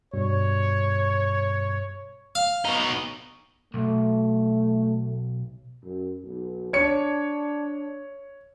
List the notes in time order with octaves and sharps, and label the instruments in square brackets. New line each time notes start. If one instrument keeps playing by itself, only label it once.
[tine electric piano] G2 B2 G3 [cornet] C#5
[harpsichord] F5
[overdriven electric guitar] B2 D#4
[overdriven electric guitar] B1 [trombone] A3
[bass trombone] F#2
B1
[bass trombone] D4 [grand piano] C#5 C#7